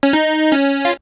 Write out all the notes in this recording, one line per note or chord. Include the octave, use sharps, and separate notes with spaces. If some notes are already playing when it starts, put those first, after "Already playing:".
C#4
D#4
C#4
F4